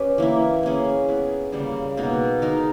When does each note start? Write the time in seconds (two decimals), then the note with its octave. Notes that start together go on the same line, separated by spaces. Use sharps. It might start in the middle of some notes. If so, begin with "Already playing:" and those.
Already playing: C#4 G4 B4
0.18 E3 A#3 E4
0.63 A#3 C#4 G#4
1.08 B3 E4 G#4
1.52 C#3 G3 A#3
1.97 B2 A#3 D#4
2.42 G#3 D#4 A#4